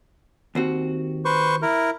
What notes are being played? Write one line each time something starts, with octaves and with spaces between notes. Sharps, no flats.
D#2 C4 F#4
B4 C5 C#6
E4 A#4